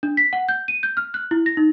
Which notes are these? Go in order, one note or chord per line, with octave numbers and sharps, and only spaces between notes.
D4
B6
F#5
G6
D#7
G6
F6
F#6
E4
A#6
D#4